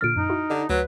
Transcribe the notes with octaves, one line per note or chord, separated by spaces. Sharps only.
A#2 D3 F6 A6 D7
F#2 D#4
E4 F#4
D3 G4 D#5
D2 F#3 B4